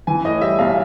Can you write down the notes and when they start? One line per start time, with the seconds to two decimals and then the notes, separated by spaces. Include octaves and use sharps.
0.07 E3 G#5
0.25 A2 D#5
0.41 G3 E5
0.59 B1 F5